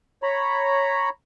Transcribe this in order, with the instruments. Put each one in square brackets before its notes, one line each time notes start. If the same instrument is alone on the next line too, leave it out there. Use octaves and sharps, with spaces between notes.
[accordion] C#5 A#5 B5